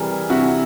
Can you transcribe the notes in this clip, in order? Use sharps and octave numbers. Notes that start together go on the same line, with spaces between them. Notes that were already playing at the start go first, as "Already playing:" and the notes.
Already playing: C3 E3 G3 G#4 A#4
C3 E4 F#4